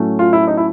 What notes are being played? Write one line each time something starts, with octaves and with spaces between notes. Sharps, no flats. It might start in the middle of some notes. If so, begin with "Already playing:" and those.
Already playing: A2 F#3 A3 C#4
F4
E4
D#4
E4